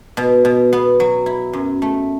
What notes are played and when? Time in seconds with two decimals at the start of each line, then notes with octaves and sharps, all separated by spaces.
0.17 B2
0.45 B2
0.73 B3
1.00 F#3
1.26 E4
1.53 F#2
1.82 A3